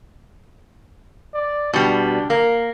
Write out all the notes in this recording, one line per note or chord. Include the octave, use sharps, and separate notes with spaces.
D5
B2 G3 D4
A#3 A#4